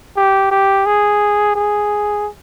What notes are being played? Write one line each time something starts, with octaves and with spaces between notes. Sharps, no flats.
G4
G4
G#4
G#4